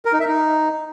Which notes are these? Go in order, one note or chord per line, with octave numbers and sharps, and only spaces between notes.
A#4
D#4
E5
D#4